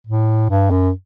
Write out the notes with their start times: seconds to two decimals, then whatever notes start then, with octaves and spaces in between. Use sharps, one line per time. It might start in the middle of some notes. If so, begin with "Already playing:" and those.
0.07 A2
0.50 G2
0.71 F#2